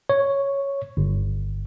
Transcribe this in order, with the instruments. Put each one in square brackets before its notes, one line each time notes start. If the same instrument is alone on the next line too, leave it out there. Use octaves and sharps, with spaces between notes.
[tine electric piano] C#5
G1